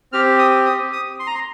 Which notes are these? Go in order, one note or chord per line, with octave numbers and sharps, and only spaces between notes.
C4 G4 F6
D#6
D#6
D#6
C6
A#5
C6